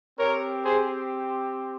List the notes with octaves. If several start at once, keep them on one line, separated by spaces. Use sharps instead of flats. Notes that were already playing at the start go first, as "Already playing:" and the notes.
C4 G4 A#4 C#5
G#4 C5